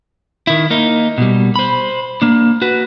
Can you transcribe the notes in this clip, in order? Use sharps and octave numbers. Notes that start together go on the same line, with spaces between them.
D#3 E4
A#3 D#4
B2 G3
C5 B5
A#3 D4
F#4 B4